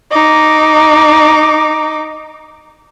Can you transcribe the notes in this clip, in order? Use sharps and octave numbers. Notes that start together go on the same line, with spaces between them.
D#4 D6